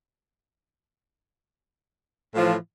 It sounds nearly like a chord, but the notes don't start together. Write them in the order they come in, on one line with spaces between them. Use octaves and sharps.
A2 F3 E3